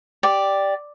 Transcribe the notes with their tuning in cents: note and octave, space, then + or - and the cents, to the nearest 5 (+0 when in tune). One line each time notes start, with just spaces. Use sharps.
G4 +0 D5 +0